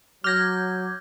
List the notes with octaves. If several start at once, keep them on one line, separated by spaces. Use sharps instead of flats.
F#3 D6 F6 G6 G#6 A#6